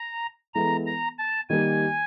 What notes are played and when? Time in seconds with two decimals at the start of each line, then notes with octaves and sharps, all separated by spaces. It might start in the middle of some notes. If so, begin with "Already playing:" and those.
Already playing: A#5
0.54 E3 G#3 B3 E4 A4 A#5
0.86 A#5
1.19 A5
1.49 D#3 G3 A#3 G#5